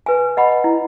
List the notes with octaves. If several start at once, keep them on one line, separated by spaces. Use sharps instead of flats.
B4 G#5
D#5 F#5 B5
E4